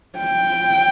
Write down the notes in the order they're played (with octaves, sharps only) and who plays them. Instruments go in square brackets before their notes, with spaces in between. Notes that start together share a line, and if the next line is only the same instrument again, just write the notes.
[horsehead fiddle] G5